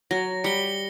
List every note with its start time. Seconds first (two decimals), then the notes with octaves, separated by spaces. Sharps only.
0.11 F#3 A#6
0.44 G3 C#7 G7